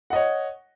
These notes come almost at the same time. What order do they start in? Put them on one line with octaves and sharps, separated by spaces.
F#5 D#5 C#5